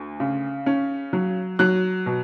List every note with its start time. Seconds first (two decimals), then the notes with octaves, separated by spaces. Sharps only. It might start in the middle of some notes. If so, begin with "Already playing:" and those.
Already playing: D2
0.20 C#3
0.66 C#4
1.13 F#3
1.59 F#3 F#6
2.06 B2